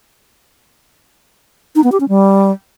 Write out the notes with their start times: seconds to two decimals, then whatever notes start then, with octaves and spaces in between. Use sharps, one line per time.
1.75 D#4
1.84 B3
1.92 G4
2.00 C#4
2.09 G3